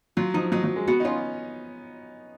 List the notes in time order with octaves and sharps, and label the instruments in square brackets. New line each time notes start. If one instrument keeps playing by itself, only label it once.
[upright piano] F#3 [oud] F4
[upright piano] F3 [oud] D#4
[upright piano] F#3 [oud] D#4
[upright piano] F#3
G#3
[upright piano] B3 [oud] F#4
[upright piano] D#4
[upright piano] C#4 [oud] F4